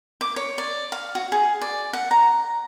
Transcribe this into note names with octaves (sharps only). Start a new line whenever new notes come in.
D6
C#5
D5
F5
F#4
G#4
D5
F#5
A#5